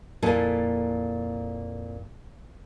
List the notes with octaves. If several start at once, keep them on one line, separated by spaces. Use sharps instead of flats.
F2 A#2 A#3 E4 A4 G#5